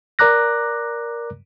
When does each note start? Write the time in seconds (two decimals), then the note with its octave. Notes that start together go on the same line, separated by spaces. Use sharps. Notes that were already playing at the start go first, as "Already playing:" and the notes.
0.19 A#4 D5 A#5 D6 F#6 A#6